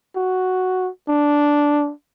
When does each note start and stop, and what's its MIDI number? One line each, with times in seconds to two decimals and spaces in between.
0.16 0.90 66
1.09 1.92 62